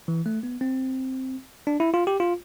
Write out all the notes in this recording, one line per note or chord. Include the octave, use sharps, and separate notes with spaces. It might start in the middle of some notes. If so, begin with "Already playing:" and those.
E3
A3
B3
C4
D4
E4
F4
G4
F4